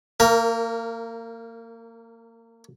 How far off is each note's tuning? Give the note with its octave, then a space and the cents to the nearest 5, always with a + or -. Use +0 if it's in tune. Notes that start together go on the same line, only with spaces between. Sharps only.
A#3 -30 A#4 +0